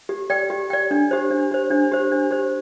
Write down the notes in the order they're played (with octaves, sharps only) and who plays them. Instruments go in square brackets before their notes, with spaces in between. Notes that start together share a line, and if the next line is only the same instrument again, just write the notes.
[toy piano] G4
D5 G5
G4
D5 G5
D4
G4 C5
D4
G4 C5
D4
G4 C5
D4
G4 C5